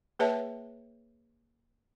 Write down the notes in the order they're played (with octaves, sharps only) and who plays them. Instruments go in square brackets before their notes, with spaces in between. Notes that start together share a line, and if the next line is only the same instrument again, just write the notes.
[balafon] A#3 G#4 B4 C#5 E5 A5